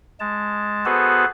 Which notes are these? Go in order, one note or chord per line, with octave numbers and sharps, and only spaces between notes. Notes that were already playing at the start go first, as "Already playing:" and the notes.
G#3 A5
B3 F#4 G#4 A4 B4 C5